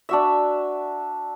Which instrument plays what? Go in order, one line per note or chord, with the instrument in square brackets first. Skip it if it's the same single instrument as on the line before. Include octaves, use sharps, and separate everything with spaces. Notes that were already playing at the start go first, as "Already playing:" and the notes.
[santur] D4 F#4 E5